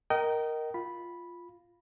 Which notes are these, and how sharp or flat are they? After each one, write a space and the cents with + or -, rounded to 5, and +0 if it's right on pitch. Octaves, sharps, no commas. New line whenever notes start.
A#4 +0 D#5 +0 G5 -30
F4 +0 B5 -5